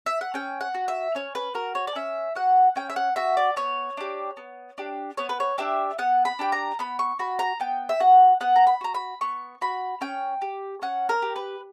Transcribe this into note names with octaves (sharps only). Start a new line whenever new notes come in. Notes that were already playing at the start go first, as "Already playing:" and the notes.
E5
F#5
C#4 G5
F#5
F#4
E5
C#4 C#5
B4
F#4 A#4
C#5
D5
C#4 E5
F#4 F#5
C#4 G5
E5
F#5
F#4 E5
D5
B3 C#5
D4 G4
B3
D4 G4
B3 C#5
B4
C#5
D4 G4 E5
B3 F#5
B5
D4 G4 G5
A#5
B3 B5
C#6
F#4 B5
A#5
B3 G5
E5
F#4 F#5
B3 F#5
A#5
B5
F#4 A#5
B5
B3 C#6
F#4 B5
C#4 G5
G4
C#4 F#5
A#4
G4
B4